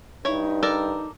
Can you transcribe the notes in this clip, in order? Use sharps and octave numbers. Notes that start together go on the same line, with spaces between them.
G2 D#4 E4 C#5
A4 A#4 D5